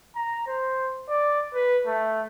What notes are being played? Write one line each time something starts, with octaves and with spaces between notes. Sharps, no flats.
A#5
C5
D5
B4
A3